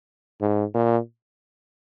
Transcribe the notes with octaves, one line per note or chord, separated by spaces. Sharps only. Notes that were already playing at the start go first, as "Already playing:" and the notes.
G#2
A#2